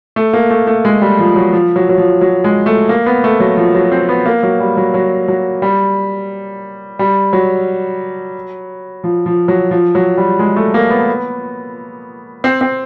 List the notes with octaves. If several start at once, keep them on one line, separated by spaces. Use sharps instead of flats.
A3
A#3
A3
A3
G#3
G3
F3
F#3
F3
F#3
F#3
F3
F#3
G#3
A3
A#3
B3
A3
F#3
F3
F#3
C4
B3
A#3
F#3
G3
F#3
F#3
F#3
G3
G3
F#3
F3
F3
F#3
F3
F#3
G3
G#3
A3
A#3
B3
C4
C4